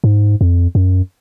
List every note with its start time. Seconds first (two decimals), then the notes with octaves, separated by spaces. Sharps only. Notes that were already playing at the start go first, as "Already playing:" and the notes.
0.04 G#2
0.41 F2
0.75 F#2